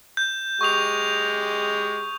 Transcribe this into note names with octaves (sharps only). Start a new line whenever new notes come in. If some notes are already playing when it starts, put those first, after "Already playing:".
G6
G#3 G4 C#6 D#6 F7